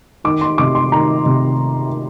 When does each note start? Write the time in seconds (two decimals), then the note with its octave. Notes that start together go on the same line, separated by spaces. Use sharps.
0.24 D#3 D6
0.41 C6
0.58 C3 D6
0.75 C6
0.92 D#3 A#5
1.26 C3